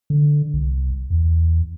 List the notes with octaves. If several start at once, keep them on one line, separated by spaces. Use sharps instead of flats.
D3
C2
E2